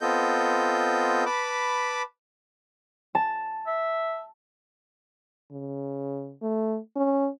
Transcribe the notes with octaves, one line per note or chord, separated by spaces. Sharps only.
B3 C4 F4 A4 D#5 G6
B4 A5 B5 D6
A5
E5
C#3
A3
C#4